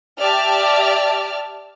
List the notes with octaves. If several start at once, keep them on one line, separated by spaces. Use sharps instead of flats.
G4 D5 E5 A5 F6